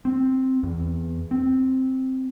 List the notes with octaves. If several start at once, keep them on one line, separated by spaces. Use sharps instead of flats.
C4
E2
C4